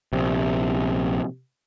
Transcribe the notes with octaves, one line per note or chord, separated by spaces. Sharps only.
A#1 C3